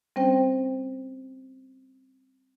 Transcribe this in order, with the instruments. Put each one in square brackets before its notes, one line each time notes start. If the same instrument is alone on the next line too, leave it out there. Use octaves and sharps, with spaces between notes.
[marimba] G3 C4 C#4 C5 G5